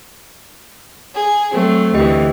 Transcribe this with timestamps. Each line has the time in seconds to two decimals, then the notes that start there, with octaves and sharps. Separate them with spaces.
1.14 G#4
1.52 F#3 A3 C4
1.94 D2 E3 G4 D#5 G5